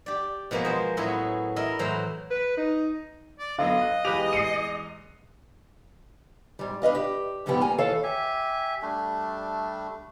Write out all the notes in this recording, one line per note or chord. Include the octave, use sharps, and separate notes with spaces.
G4 D5
B2 F3 A#3 B3 G#4
G#3 C5
A2 F#3 B3 C#4 E4 G#4
E4 A#4 D#5
A2 E3 F#3 C5 A#5 B5
B4
D#4
D5
D3 F#3 B3 D#5 F5
F#6
E2 G#3 G4 B4 F7
C7 C#7 D#7
G#2 G3
D4 B4 D#5 F5
G4
F2 G#2 D3 F3 B3 G4
A#3 G#5 A#5
D#2 E3 A4 C#5 F5
G4 E5 G#5
G3 A3 D4